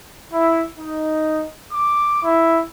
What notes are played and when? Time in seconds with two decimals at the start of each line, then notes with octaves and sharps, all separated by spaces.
0.31 E4
0.77 D#4
1.70 D6
2.22 E4